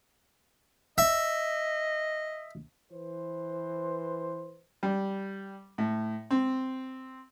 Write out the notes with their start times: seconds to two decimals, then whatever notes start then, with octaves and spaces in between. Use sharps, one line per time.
0.98 D#5 E5
2.92 E3 B4 C5
4.83 G3
5.78 A2
6.31 C4